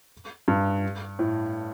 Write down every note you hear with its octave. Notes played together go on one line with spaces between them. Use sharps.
G2
A2